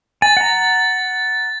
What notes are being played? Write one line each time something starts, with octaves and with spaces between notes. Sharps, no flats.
G#5 A6
F#5 A#5